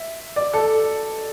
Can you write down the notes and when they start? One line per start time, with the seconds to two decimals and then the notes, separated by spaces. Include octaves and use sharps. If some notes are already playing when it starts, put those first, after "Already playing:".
Already playing: E5
0.36 D5
0.53 A4